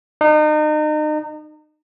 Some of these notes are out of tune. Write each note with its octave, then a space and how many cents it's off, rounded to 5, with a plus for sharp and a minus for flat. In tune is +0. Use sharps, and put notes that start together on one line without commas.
D#4 -35